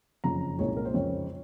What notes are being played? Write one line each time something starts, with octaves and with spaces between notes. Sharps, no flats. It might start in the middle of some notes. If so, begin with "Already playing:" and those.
F#1 F2 C#3 F3 A#5
C2 A#2 G#3 C#4 C#5
A#4
C5
F2 C#3 G#3 C4 C#5